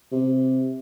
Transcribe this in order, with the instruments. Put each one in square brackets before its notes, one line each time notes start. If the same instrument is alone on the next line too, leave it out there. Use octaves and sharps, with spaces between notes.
[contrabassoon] C3